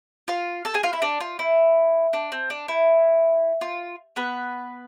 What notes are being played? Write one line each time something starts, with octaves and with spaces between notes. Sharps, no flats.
F4 F5
A4 A5
G#4 G#5
F4 F5
E4 E5
D4 D5
F4
E4
D4
C4
D4
E4
F4
B3 B4